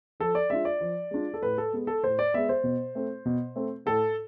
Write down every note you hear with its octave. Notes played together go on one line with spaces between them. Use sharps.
F3 A4
D5
G#3 D4 F4 E5
D5
F3
G#3 D4 F4
A4
A2 B4
A4
G#3 B3
A4
A2 C5
D5
G#3 B3 E5
C5
B2
A3 C4
B2
A3 C4
A2 A4